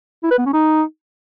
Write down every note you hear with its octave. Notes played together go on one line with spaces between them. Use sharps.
E4
B4
B3
C#4
D#4